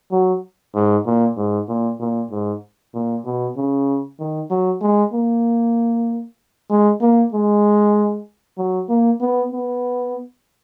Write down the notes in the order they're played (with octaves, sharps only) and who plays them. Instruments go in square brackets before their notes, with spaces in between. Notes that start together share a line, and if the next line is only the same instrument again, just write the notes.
[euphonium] F#3
G#2
A#2
G#2
A#2
A#2
G#2
A#2
B2
C#3
D#3
F#3
G#3
A#3
G#3
A#3
G#3
F#3
A#3
B3
B3